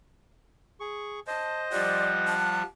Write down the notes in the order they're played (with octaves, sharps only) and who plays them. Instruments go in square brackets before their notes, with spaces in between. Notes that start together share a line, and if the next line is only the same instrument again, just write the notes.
[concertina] G#4 C#6
[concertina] C5 D#5 [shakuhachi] A5
[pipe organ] F3 G3 [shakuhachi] D5 [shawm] F#5
[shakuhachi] A5